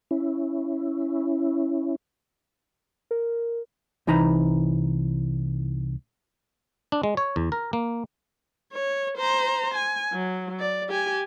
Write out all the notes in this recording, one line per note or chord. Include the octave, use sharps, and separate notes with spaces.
C#4 E4
A#4
C2 E3 D#4 A#5 B5
D4
G#3
C#5
E2
A#4
A#3
C#5
C5 A#5
G#5
F#3
D5
G4 G#5